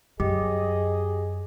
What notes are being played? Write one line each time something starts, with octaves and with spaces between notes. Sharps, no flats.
F#2 G4 G#4 D#5